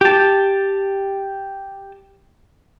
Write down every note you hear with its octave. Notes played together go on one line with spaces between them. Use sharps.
G4 A5